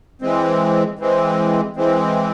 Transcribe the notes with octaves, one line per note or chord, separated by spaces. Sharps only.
E3 G#3 C4
E3 G#3 C4
E3 G#3 C4